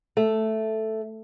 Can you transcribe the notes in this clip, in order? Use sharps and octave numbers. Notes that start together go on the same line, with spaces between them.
A3